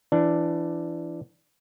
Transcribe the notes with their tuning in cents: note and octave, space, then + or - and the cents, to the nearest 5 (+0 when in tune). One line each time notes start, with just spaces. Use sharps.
E3 +25 D4 +0